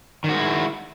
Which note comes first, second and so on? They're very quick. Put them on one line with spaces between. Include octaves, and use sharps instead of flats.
D#3 F#4 G#3 E4